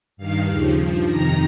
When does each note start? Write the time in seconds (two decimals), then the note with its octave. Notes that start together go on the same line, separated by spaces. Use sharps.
0.17 G2 D#3 F5
0.46 D#2 C#3 F3
0.76 G2 F3
1.06 F2 C3 D#3 A#5